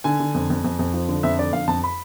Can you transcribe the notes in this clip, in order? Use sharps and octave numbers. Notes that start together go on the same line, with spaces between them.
D3 G#5
D3
F2
F2
F2
F2
F3
D3
F2 E5
D3 D5
F2 F5
F2 A5
B5